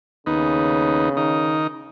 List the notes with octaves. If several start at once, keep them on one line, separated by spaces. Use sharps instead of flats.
D#2 C#3 B3 D#4
D#3 D#4 A#4